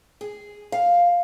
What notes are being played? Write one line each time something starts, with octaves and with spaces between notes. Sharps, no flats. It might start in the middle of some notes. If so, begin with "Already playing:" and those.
G#4
F5